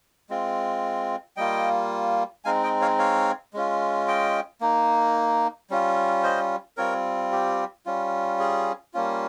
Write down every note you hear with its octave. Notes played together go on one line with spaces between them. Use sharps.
G#3 C4 F4
G3 A#3 F4 D#5 G5
G#3 C4 D#4 F5 G#5
D#5 G5
C#5 F5
C#5 F5
G#3 C#4 F4
D#5 G5
A#3 D#4
G3 C#4 F4
C5 D#5
G3 C4 F4 A#4 C#5
G4
G3 C#4 F4
G#4
G3 A#3 C#4 F4